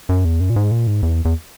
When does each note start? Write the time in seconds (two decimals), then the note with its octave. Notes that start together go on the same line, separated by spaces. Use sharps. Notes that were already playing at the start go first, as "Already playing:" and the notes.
0.09 F#2
0.25 E2
0.40 F#2
0.50 A#2
0.56 G#2
0.71 A#2
0.87 G#2
1.03 E2
1.25 E2